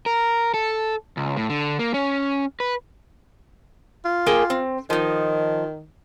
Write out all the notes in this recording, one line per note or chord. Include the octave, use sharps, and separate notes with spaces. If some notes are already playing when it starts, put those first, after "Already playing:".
A#4
A4
C#2
A2
D3
A#3
C#4
B4
F4
A#3 G#4 G5
C4
D#3 F3 D#4